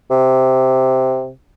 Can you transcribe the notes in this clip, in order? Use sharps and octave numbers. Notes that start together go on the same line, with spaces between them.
C3